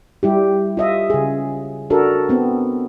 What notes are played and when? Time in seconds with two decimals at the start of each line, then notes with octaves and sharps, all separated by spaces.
0.23 G3 E4 G4
0.77 F4 D#5 E5
1.10 C#3 G#4
1.90 D4 F#4 A4 A#4
2.29 B3 C4